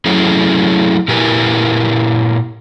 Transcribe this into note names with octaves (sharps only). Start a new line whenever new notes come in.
F#3 A3 C#4 E4 G#4
A#2 E4 G4 A#4 B4 G#5